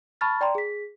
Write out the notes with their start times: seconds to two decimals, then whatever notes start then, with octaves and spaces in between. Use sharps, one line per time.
0.21 A5 B5 C#6 F6 A6
0.41 D5 G5 A#5 C6
0.55 G#4 B6